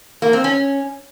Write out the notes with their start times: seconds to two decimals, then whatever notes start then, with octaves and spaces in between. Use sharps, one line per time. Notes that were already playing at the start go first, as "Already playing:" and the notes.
0.22 A#3
0.33 C4
0.44 C#4